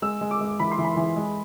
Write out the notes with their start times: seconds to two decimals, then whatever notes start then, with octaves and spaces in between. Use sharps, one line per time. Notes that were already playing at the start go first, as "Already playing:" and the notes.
0.02 G#3 E6
0.21 G#3
0.31 D6
0.40 G#3
0.59 E3 B5
0.72 C6
0.78 E3
0.84 B5
0.97 E3
1.16 G#3